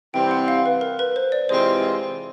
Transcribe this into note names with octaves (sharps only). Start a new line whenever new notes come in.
C3 E3 G3 C4 G5
F#5
F5
B4
A#4
B4
C5
D5
C3 E3 G#3 C4 F4 C5